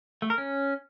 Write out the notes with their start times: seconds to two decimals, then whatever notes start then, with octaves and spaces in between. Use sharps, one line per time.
0.22 A3
0.30 A#4
0.38 C#4